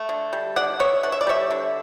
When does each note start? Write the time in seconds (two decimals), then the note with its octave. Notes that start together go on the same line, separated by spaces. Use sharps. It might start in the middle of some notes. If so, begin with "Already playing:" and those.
Already playing: A3
0.09 D3
0.33 G3
0.56 D3 D5 F#5
0.79 B3 C#5 E5
1.03 D3 F#5
1.12 E5
1.21 D5
1.27 G3 C#5 E5
1.50 D3